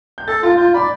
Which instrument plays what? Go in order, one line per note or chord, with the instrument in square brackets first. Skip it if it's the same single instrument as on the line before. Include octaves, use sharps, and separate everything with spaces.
[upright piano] G6
[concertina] A4 [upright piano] A6
[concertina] F4 [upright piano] A6
[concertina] F4 [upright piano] G6
[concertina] D5 [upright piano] B5